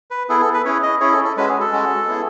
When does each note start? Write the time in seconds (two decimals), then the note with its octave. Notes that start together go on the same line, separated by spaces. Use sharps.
0.11 B4
0.29 B3 E4 G#4 A4
0.41 A4
0.53 B4
0.65 C#4 E4 G#4 C#5
0.83 D#5
1.01 C#4 E4 G#4 C#5
1.12 A4
1.24 A4
1.37 G#3 C#4 F#4 B4
1.49 G#4
1.60 A4
1.72 G#3 C#4 F#4
2.08 B3 E4 G#4